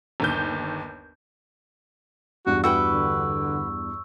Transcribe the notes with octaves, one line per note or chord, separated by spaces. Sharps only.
G1 D#2 G6
E2 G2 F#4
E4 F#4 B4 G5 C#6 E6
D3